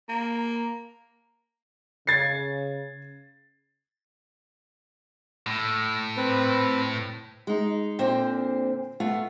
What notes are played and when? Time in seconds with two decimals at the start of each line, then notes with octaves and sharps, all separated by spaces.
0.09 A#3
2.07 C#3 G#6 A6 C7
5.47 A2
6.17 C4 B4
7.47 G#3 D#4
7.99 A#2 D3 C4 C5 G5
9.00 A3 B3 F4 F5